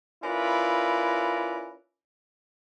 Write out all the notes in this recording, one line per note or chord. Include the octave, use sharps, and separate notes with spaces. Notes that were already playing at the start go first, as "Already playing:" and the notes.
C#4 E4 F4 A#4 B4 D5